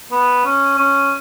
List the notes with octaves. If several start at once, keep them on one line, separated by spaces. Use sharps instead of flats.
B3
C#4
C#4